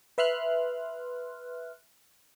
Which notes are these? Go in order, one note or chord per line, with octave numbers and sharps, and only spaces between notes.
B4 E5 C6 F6 F#6